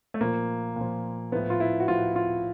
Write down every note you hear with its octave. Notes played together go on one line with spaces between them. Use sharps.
A3
A#2 F3 A#3
A#2 F3
A2 F3 B3
F4
E4
F#4
A2 F3 F4
F4